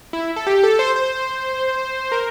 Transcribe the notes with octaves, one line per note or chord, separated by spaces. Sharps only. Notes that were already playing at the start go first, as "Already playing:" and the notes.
E4
A4
G4
A4
C5
C5
A#4